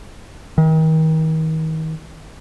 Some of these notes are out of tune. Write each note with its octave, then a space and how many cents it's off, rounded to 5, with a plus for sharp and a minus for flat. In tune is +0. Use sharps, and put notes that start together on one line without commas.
D#3 +35